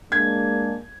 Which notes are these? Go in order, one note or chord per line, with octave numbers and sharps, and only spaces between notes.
G#3 A#3 D4 G#6